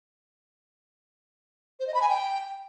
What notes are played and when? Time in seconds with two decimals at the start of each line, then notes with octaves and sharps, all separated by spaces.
1.80 C5
1.87 D#5
1.94 B5
2.02 G#5
2.09 G5